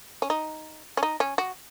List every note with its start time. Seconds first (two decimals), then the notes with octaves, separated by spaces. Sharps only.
0.22 C#4
0.30 D#4
0.97 C#4
1.03 D#4
1.20 C#4
1.38 F#4